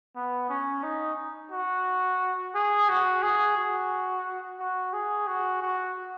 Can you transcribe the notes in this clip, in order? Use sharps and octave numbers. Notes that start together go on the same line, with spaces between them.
B3
C#4
D#4
F#4
G#4
F#4
G#4
F#4
F#4
G#4
F#4
F#4